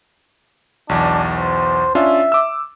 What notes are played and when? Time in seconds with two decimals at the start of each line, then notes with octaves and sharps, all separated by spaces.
0.89 B1 E2 D4
1.38 C5
1.95 C#4 D4 F4 E5
2.32 D6 E6